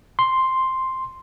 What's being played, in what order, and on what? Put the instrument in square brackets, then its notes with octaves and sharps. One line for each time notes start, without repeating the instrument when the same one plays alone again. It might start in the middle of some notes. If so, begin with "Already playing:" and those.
[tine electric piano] C6